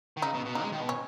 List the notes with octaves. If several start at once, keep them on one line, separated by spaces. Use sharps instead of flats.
D#3
C#3 D#4
B2
B2
C#3 D#4
G#3
D#3
B2
C#4